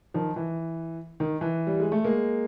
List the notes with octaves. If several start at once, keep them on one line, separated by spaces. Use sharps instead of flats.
D#3 F3
E3
D#3
E3
G3
G#3
A3
G#3 A#3